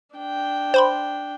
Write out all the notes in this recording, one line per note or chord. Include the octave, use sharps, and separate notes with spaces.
D4 G5
C5 B5 C6